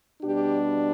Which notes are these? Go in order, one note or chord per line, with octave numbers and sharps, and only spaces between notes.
B2 G3 D4 G4